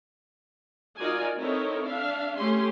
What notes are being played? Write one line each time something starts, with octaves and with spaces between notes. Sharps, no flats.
D#4 F4 F#4 A#4 D5 G#5
C4 D#4 E4 A4 A#4 C#5
D4 E5 F5
A3 C#4 G4 C6